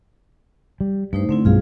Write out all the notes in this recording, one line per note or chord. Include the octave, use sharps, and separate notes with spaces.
G3
G2 A3 D#4 C5
D3 A3 C4 E4
B1 G2 B3 F4 G#4 F5